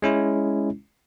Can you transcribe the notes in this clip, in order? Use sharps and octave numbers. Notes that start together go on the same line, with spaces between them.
G#3 C#4 E4